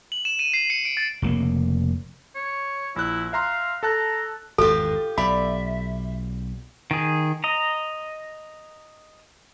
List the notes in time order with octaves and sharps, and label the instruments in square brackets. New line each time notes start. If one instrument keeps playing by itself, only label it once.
[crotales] F#7
E7
D#7
C7
C#7
D7
A6
[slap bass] F1 C#3 A#3
[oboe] C#5
[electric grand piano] A#1 F#6 [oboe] E4
[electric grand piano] E5 A#5 C6 [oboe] F5
[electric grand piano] A4 A5 F#6 [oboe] A#5
[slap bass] G#1 E2 G2 [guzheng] F4 G4 [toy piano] A4
[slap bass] B1 [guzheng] D5 [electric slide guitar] E5 [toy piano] B5
[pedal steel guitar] D#3 G#4
D#5 A#5